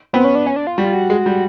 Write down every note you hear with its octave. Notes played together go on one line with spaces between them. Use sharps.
B3 C4
C#4
D4
C#4
D4
F4
G3 F#4
F4
F#4
G#3
G3